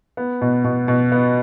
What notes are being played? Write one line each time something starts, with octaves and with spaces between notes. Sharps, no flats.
B3
B2
B2
B2
B3